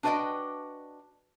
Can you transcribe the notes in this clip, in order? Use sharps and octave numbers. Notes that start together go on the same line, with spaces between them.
D4 F#4 B4 D5 D#5 G5